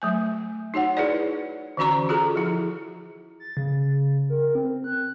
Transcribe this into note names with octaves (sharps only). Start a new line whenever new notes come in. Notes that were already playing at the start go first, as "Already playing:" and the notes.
F#3 A3 G#5
D#4 F#4 C#5 F#5
E4 G#4 B4 C#5 D5
D3 E3 C#4 F#4 A#5 C#6
F4 F#4 G#4 A4 A#5
F3 E4 G#4
A6
C#3
A#4
C4
F#6